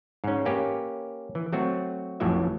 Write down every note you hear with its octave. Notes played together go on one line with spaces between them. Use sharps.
G#2 C#4
A#3 C#4 G4 B4
E3
F#3 A3 C4 F#4
A1 F2 A2 F#3 E5